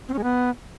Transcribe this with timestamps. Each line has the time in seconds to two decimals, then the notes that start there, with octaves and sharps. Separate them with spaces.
0.08 C4
0.13 C#4
0.18 G#3
0.23 B3